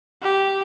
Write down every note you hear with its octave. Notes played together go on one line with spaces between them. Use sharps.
G4